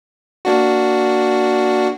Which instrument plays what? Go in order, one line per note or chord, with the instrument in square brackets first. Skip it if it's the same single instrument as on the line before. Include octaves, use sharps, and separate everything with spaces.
[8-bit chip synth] A#3 D4 F#4